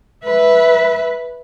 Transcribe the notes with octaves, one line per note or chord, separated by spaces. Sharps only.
B4 E5